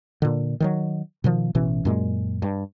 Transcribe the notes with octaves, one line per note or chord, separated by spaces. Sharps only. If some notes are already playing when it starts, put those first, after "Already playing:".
A#2 D3
D#3 F3 F#3
B2 D#3 F3
A1 B2 E3 C#4
F#2 A#2 G#3
G2